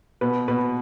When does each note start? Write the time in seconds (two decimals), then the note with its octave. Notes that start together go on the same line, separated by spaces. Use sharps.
0.21 B2 B4
0.48 B2 B4